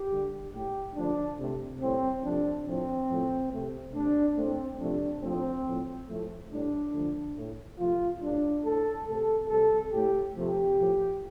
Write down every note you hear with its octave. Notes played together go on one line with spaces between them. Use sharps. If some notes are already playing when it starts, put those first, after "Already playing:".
Already playing: G4
D3 G3
A2 A3 G4
D3 F3 A3 D4
C3 A3
A2 G3 C4
C3 F3 A3 D4
A2 F3 A3 C4
A2 F3 A3
C3 A3
C3 A3 D4
A2 A3 C4
C3 F3 A3 D4
A2 F3 A3 C4
A2 F3 A3
A2 F3 A3
A2 G3 D4
D3 F3 A3
A2 A3
C3 F3 A3 F4
A2 G3 D4
A2 A3 A4
C3 A3 A4
C3 G3 A4
A2 A3 G4
C3 F3 A3 G4
A2 F3 A3